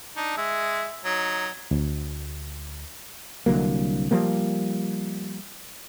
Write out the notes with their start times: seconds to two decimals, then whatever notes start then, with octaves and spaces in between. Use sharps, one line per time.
0.16 D4 D#4
0.37 G#3 E5
1.05 F#3 D#4
1.71 D2
3.46 C2 D3 F#3 A#3
4.11 F3 G3 A#3